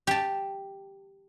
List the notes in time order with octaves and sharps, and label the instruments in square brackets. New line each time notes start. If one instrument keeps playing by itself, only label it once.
[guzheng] G4 A5